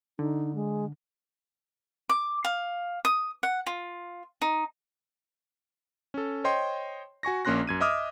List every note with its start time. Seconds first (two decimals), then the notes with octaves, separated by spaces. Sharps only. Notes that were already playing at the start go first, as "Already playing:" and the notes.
0.19 D3 D#4
0.55 G#3
2.09 D6
2.45 F5
3.05 D#6
3.43 F#5
3.66 F4
4.42 D#4
6.14 C#4 A4
6.44 C5 C#5 D#5 G5 C6
7.23 F#4 G#5 C#6 A#6
7.45 A#1 A#3 C#4 C6 F#6 A#6
7.67 F#2 G#6 D#7
7.80 D#5 E5 D6 D#6 F6